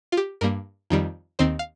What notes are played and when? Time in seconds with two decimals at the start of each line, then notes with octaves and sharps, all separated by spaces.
0.12 F4
0.17 G4
0.41 G2 G3 A#3 A#4
0.90 F2 D#3 G3
1.39 D#2 D#3 C4 C5
1.59 F5